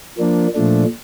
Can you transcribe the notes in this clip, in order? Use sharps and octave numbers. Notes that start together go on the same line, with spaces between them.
F3 A#3 D4
A#2 F3 A3 D4